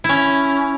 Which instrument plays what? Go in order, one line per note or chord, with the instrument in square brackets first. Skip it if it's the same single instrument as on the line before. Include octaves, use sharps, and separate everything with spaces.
[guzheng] C#4 E4